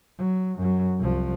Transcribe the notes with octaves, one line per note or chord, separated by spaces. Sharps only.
F#3
F#2 F#3
C2 F3